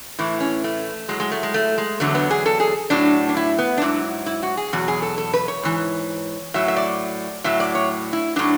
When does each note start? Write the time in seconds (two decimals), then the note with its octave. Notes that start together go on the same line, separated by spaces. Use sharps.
0.19 A2 E3 E4
0.40 C#4
0.64 A3
1.09 A2 F#3 G#3
1.20 G#3
1.31 A3
1.43 G#3
1.54 A3
1.78 G#3
2.00 E2 D3 F#3 A3
2.15 B3
2.31 G#4
2.46 A4
2.60 G#4
2.90 A2 F#3 D4
3.29 D4
3.37 E4
3.58 B3
3.78 D4
3.82 G#2 F#3 E4
4.26 E4
4.43 F#4
4.57 G#4
4.73 E2 B2 F#3 F#4
4.88 G#4
5.02 A4
5.18 A4
5.34 B4
5.48 C#5
5.63 G#2 E3
6.54 A2 F#3 E5
6.68 E5
6.76 D5
7.44 A2 F#3 E5
7.60 D5
7.75 C#5
8.13 E4
8.36 A2 F#3 D4